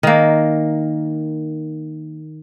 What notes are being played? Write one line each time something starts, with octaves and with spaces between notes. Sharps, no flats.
D#3 A#3